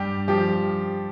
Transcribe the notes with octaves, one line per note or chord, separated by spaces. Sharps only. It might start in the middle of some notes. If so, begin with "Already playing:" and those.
Already playing: G2 G3 G4
F3 G4